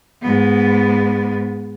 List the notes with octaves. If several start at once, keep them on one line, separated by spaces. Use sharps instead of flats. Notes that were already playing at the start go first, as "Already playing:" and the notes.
G#2 B3